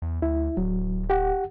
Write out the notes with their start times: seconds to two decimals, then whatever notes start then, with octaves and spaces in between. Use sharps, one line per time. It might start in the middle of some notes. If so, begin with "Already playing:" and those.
0.02 E2
0.22 D2 E4
0.57 D1 F#3
1.10 G4 F#5